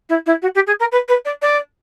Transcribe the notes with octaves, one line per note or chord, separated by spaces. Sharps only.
E4
E4
F#4
G4
G#4
A#4
B4
B4
D5
D5